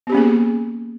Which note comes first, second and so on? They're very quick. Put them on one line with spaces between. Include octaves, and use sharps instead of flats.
B3 G4 C#4 A#3 G#4